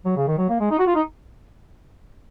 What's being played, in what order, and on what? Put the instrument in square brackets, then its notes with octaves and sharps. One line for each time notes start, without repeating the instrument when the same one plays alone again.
[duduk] F#3
C#3
D#3
F#3
A#3
G#3
D#4
F#4
F4
D#4